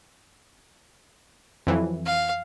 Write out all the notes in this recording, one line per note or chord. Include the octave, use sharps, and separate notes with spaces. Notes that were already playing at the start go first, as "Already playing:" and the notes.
F2 E3 F#3
F5